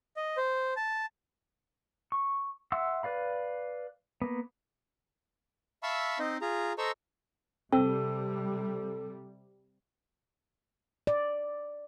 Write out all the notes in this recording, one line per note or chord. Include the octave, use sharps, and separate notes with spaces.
D#5
C5
A5
C#6
E5 F#5 C6 E6
B4 D5 F5 B5
A#3 B3
E5 F5 A5 B5 C#6 E6
C4 D#4 C5 D#5
F4 G#4 A#5
A4 C5 D#5 A#5 C#6 E6
C3 G3 C4 A4
D5